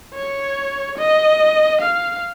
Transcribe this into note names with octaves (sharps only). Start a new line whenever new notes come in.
C#5
D#5
F5